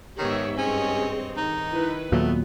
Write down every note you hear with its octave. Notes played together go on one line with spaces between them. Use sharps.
G#2 D#3 B3 G4 G#4 C#5 E5
G2 C4 C#4 G#4 C#5 D#5
D#3 D#4
E4 B4
D#2 A#2 F#3 A3 B3